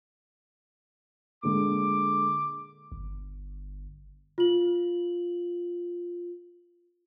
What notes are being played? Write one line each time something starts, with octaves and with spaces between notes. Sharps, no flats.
A#2 D3 G#3 D6
G1
F4 F#7